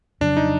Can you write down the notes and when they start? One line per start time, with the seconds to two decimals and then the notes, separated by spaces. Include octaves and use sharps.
0.21 F2 C#3 F#3 D4
0.37 D#4